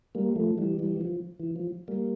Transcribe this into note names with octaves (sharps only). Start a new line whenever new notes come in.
G3 A#3
F3 A3
E3 G3
E3 G3
E3
F3
E3
F3
G3 A#3